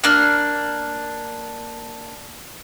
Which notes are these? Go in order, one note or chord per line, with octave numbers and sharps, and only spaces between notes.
A#3 D4 F6